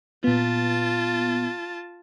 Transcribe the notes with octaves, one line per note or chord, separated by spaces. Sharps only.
A#2 B3 F4 A5